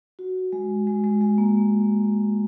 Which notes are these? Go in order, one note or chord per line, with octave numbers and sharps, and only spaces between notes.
F#4
G#3
G#3
G#3
G#3
A#3